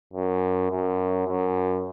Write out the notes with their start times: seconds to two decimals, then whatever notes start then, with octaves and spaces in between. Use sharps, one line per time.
0.13 F#2
0.71 F#2
1.28 F#2